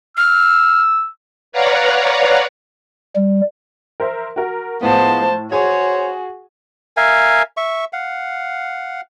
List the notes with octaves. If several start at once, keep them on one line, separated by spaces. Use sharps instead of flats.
E6 F6
B4 C#5 D5 F5 F#5 A#5
G3
A#4 C5 E5
F#4 A#4
A2 F3 G#3 B3 C5 A5
F#4 G#4 C5 C#5 G#5
A#4 E5 F5 G#5
E5 C#6
F5 F#5